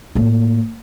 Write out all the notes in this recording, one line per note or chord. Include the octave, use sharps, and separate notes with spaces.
A2 A#3